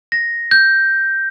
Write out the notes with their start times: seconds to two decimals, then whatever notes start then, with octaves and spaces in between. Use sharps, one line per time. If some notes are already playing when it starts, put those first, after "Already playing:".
0.12 A#6
0.51 G6